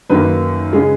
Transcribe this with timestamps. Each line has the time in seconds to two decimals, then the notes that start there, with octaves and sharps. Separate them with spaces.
0.10 F#2 D#3 A#3 B4
0.73 C#3 G#3